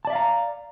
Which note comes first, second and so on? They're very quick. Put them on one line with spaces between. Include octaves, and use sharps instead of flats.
A5 D5 E5 F5 A#5